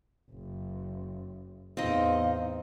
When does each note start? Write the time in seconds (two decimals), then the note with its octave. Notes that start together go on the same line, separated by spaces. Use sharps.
0.31 F#1
1.77 E2 A2 C4 D#4 D#5 F5